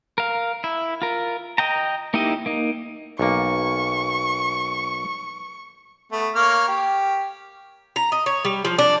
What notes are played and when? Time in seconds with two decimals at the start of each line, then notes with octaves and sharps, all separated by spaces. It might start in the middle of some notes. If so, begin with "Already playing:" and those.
0.18 A#4 F5
0.64 E4
1.02 F4 A#4
1.58 D#5 G5 A#5
2.14 A#3 D#4 E4 G4 D#5
2.46 A#3 D#4
3.19 B1 A#3 C#6
6.12 A3 B3
6.35 A#3 C#5 F6
6.68 G4
7.96 A#5
8.12 D#5
8.26 C#5
8.45 G3
8.65 F3
8.78 D4